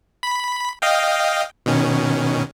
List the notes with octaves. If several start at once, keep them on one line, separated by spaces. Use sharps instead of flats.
B5
D#5 F5 G5
B2 D#3 C#4